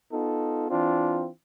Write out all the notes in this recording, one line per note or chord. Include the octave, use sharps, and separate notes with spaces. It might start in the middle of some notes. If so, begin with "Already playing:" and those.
B3 D#4 F4 A4
E3 C4 D4 F4